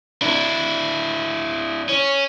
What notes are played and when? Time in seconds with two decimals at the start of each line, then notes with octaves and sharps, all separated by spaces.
0.22 D4 E4
1.89 C#4